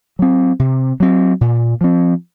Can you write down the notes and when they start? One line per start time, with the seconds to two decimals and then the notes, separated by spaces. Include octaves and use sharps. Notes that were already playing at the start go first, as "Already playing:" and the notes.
0.19 F#3 C4
0.59 C3
1.00 F#3 C4
1.41 A#2
1.81 F3 C4